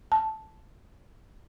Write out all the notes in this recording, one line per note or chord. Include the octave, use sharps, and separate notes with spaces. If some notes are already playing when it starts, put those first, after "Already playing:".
A5